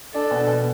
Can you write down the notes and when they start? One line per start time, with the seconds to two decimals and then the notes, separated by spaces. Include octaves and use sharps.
0.13 D4 A4
0.31 B2
0.47 B2